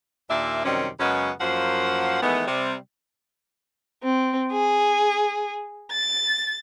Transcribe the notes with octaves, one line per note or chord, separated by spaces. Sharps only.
D#2 A#2 D4 D5 E5
F#2 C3 D#3 G3 C4 C#4
F#2 C#3 G#3 B3 C#4
F#2 F3 A#3 C5 F#5
D#3 E3 G#3 A3 B3
C3 G3
C4
G#4
A6